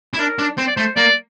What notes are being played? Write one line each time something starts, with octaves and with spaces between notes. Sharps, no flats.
E4
D4 A#4
D4
C4 C5
D5
A3 C5
A#3 D5